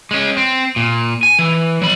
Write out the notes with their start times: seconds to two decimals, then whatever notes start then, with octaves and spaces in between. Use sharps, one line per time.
0.11 G#3 C#4
0.37 C4
0.76 A#2
1.23 G#5
1.39 E3
1.82 F#3 B5